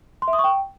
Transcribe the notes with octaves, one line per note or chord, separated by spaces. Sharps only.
C6
E5
D#6
C#6
G5